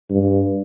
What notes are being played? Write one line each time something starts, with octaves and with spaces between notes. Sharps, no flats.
G2